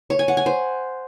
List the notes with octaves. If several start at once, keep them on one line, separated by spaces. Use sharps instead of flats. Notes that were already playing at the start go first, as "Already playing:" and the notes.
C#5
G#5
F#5
G#5
C5